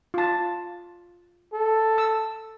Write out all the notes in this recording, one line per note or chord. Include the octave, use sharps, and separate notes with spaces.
F4 A5
A4
E6